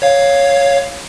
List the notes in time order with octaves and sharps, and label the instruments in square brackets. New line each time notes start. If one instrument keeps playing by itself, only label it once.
[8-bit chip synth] C#5 F5